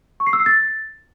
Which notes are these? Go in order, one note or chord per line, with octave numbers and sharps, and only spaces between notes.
C#6
C7
E6
C7
A6